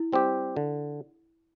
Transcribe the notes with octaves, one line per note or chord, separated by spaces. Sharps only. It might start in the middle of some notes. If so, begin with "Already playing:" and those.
Already playing: E4
G3 C4 G4
D3